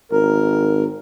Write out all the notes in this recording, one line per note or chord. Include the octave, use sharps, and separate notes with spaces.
G#1 A#4